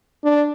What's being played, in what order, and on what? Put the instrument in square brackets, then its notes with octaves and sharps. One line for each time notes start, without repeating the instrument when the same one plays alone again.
[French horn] D4